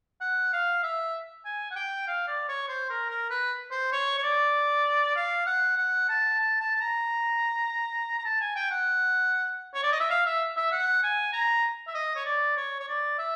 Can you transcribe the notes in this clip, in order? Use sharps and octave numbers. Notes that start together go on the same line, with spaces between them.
F#5
F5
E5
G#5
F#5
G5
F5
D5
C#5
C5
A#4
A#4
B4
C5
C#5
C#5
D5
F5
F#5
F#5
A5
A5
A5
A5
A#5
A#5
A5
G#5
G5
F#5
C#5
D5
D#5
E5
F5
E5
E5
F#5
G#5
A#5
E5
D#5
C#5
D5
C#5
C#5
D5
E5